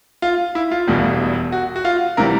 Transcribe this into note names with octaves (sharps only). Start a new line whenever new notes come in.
F4
E4
F4
E1 E2 B2 G3
F#4
F#4
F4
C3 E3 G3 A#4